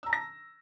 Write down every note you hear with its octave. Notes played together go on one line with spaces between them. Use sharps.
A5 A#5 E6 A#6